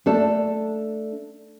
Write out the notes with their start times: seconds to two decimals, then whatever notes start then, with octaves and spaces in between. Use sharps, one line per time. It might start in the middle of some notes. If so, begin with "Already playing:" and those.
0.06 A3 D4 A4